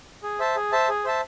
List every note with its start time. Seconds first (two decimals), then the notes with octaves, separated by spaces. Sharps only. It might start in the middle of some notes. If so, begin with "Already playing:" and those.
0.23 G#4
0.39 C5 E5 A5
0.56 G#4
0.72 C5 E5 A5
0.89 G#4
1.05 C5 E5 A5